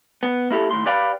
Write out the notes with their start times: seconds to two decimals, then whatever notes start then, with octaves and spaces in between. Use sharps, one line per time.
0.23 B3
0.51 A#3 E4 G4 A4
0.71 D#2 A2 C6
0.86 G4 B4 D5 F5 G5 B5